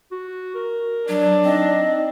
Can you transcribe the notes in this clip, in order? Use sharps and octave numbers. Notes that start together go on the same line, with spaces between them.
F#4
A#4
F#3 D4
C4 D#4 D#5